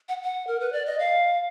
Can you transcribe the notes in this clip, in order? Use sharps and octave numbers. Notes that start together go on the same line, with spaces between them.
F#5
F#5
A#4
B4
D5
D#5
F5